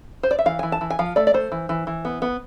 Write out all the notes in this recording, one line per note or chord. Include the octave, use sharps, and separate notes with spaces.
C5
D5
E5
E3 F5
E3 G#5
A5
E3
G#5
F3 F5
A3 D5
D5
A3 C5
E3
E3
E3
B3
B3